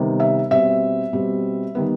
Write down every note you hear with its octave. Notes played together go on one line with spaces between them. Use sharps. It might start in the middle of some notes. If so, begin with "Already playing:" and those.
Already playing: C3 D#3 G3 B3
E5
B2 G3 C4 E5
B2 G3 C4
D#3 G3 B3